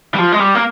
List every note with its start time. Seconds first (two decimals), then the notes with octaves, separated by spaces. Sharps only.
0.15 G3
0.18 F3
0.32 G#3
0.40 G3
0.55 A#3